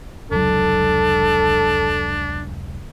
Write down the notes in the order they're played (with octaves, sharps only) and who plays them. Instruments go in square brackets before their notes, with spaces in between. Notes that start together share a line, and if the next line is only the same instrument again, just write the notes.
[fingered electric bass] F1 C#2 F#3 [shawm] D4 [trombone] A4